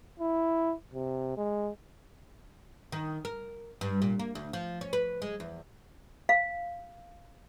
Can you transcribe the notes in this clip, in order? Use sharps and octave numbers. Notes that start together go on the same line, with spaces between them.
E4
C3
G#3
D#3
A#4
G2
A#2
A#3
D2
F3
C#4
B4
G#3
E2
F5